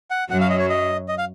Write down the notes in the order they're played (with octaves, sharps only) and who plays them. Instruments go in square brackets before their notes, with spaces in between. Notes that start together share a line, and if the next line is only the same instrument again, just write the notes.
[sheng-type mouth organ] F#5
[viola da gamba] F#2 F#3 [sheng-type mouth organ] F#5
[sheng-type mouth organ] F5
D#5
C#5
D#5
D#5
F5